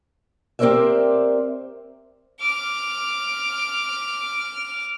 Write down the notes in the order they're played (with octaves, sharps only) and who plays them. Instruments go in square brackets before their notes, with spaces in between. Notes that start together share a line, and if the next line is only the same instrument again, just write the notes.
[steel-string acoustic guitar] C4 G4 A#4 C5 D5 E5
[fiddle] D6 F6